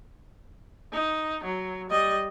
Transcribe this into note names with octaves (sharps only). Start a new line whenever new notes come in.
D#4
F#3
G3 D#5